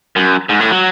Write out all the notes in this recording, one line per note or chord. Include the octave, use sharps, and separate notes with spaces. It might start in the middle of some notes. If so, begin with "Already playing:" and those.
F#2
G#2
A2
F#3